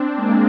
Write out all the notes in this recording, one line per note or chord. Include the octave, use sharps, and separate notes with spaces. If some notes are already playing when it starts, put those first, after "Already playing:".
Already playing: C4 D4
G#3 A#3